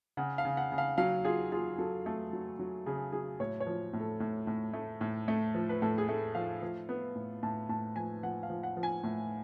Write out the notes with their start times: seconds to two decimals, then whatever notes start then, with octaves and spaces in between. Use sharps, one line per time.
0.17 C#3 F#5
0.38 F5
0.45 C#3
0.57 F#5
0.72 C#3
0.78 F5
0.98 F#3 F5
1.25 F4 G#4
1.52 F4 G#4
1.78 F#3 A4
2.06 A3 A4
2.33 F#3
2.59 F#3
2.86 C#3 G#4
3.12 F#3 G#4
3.40 A2 C#5
3.60 C#5
3.67 F3
3.93 A2
4.00 A4
4.20 A2
4.47 A2
4.73 A3
5.01 A2
5.28 A3
5.55 F3
5.69 B4
5.82 A2 A4
5.98 G#4
6.08 A3 A4
6.35 F3 F5
6.62 F3
6.89 B3
7.16 A2
7.43 A2 A5
7.69 A2 A5
7.96 F3 G#5
8.23 F3 F#5
8.43 F5
8.50 F3
8.63 F#5
8.77 F3
8.83 G#5
9.03 A2